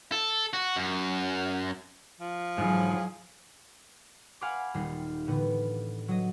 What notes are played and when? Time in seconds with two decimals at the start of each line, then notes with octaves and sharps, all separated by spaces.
0.12 A4
0.53 F#4
0.77 F#2
2.20 F3
2.58 G#2 D3 E3 F#3 G#4
4.41 F5 F#5 G#5 B5 C6 D6
4.74 D#1 G3 D#4 C7
5.27 A2 D3 E3 B3
6.08 F#3 D#5